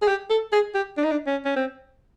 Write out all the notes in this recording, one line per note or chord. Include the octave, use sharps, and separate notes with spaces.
G#4
G4
A4
G#4
G4
D4
D#4
D4
C#4
C#4
C4